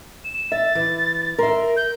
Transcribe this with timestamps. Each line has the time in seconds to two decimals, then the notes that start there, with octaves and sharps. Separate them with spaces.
0.24 E7
0.52 E5 A6
0.75 E3
1.39 A#4 E5 C6
1.77 G6